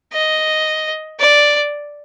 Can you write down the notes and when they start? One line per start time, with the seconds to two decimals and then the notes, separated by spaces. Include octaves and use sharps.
0.13 D#5
1.20 D5